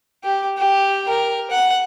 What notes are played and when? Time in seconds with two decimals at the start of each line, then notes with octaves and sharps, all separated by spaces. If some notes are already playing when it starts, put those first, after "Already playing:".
0.24 G4
0.58 G4
1.08 A#4
1.51 F#5